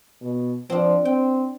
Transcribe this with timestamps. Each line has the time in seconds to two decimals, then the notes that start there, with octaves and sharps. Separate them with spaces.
0.22 B2
0.70 F3 C4 D4
1.05 C4 G5